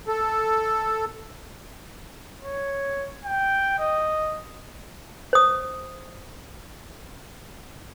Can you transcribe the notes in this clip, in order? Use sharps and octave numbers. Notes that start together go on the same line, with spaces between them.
A4
C#5
G5
D#5
C5 D#6